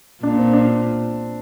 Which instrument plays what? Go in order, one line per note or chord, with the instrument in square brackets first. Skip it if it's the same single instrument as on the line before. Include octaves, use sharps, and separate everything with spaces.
[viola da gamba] A#2 [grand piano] D4
[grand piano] C4
D4